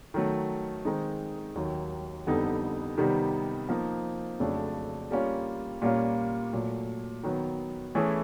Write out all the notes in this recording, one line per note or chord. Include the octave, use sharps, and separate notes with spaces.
D#3 F#3 A3
D#3 G#3 C4 D#4
D#2 D#3 F#3
F2 D3 G3 B3 D#4
C3 D#3 G3 B3 D#4
F3 A#3 D#4
F2 C#3 F#3 A3 D4
G3 A#3 C#4 F4
A#2 G3 A#3 C#4 F4
A#2 F#3 A3
D#3 F#3 B3
E3 A3 C#4 E4 G#4